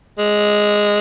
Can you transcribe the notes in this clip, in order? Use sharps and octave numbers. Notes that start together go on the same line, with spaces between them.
G#3